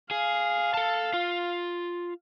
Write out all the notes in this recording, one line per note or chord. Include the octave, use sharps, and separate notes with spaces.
G#4 F5
A4 A5
F4